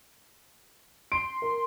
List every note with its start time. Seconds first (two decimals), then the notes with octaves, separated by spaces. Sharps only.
1.12 C6 D7
1.42 A#4